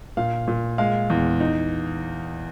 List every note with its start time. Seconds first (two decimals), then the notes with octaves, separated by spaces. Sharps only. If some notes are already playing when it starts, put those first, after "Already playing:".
0.17 A#2 F5
0.48 A#2
0.78 G#3 F5
1.10 E2
1.40 D#4